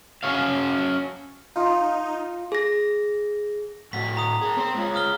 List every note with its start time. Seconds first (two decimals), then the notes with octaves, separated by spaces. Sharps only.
0.23 C#4 D#4 F#4 C#5 F5
1.56 D#4 F4
2.52 G#4 A#6
3.93 A2 F#4 B6
4.17 A#5 D#6
4.41 G#4 A#4
4.57 C4 C5
4.74 G#3 F4
4.95 D#6 F6 G7